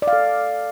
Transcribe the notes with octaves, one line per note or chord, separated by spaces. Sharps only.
D5
F5
A4